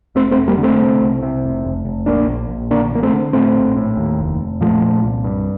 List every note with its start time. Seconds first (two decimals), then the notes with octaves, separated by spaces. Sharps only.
0.15 F1 A3 C4
0.31 A3 C4
0.37 F1
0.48 G3 A#3
0.58 D3
0.63 A3 C4
0.80 C3
1.01 C2
1.23 C3
1.44 F1
1.65 F1
1.85 F1
2.06 A#1 A#3 D4
2.28 A#1
2.49 A#1
2.71 D3 A#3 D4
2.91 A1 A#3
3.03 A3 C4
3.12 D3
3.33 A2 A3 C4
3.55 A#1
3.77 A2
3.97 D#2
4.19 F1
4.41 F1
4.61 A#2 F3 A3
4.82 A#2
5.04 C2
5.24 G2